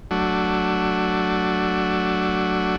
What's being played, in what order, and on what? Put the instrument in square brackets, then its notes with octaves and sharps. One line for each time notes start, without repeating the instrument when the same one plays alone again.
[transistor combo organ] F#3 A3 D4 F#4